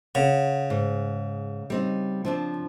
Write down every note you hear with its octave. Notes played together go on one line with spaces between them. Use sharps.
C#3 F#5
G#2
G3 C4 D#4
F3 C4 D4